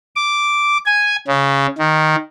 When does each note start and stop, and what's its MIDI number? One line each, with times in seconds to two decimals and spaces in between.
0.16 0.77 86
0.86 1.16 80
1.27 1.66 49
1.78 2.16 51